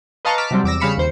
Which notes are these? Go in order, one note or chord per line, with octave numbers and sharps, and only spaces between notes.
B4 D#5 F5 A5 A#5 C#6
A5 D6 F6 B6
C3 F#3 G3 C4
E2 D6 E6 A#6
C#3 G3 F5 B5 C#7 E7
D#2 C5 C#7